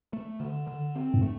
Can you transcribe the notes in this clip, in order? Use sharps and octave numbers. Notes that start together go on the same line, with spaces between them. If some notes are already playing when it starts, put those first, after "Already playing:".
A3
D3
D3
C4
G2
A3